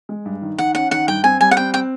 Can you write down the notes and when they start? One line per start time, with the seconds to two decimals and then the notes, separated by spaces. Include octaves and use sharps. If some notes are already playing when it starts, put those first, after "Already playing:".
0.09 G#3
0.25 G2
0.42 D#3
0.58 D#3 F#5
0.75 C#4 F#5
0.91 D#3 F#5
1.08 G2 G5
1.24 C4 G#5
1.40 G3 G#5
1.51 F#5
1.57 C4 G5
1.74 C4 G5